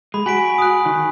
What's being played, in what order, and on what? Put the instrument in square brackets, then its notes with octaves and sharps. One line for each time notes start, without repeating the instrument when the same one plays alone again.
[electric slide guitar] G#3 [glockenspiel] B5
[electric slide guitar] F#4 [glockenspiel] G#5 B6 D7
[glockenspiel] D#6 F#6
[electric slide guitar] D#3